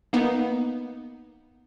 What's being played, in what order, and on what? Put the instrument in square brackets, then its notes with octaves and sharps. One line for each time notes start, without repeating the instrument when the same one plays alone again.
[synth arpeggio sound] A#3 B3 D#4